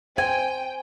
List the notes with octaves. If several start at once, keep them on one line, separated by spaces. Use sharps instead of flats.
C5 G5 G#5